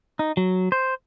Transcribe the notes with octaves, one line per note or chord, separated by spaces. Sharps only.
D#4
F#3
C5